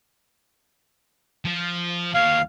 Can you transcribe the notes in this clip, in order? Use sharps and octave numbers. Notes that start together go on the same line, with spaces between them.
F3
D#2 C#5 F5